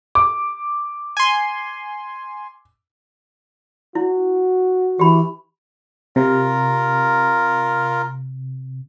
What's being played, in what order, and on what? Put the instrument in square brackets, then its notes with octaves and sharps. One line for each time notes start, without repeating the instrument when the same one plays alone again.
[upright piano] D6
[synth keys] G#5 C6
[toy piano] E4 [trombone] F#4
[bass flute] E3 [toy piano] G4 B5
[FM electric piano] C3 [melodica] F4 A#4